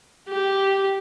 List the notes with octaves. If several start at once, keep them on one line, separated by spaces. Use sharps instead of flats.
G4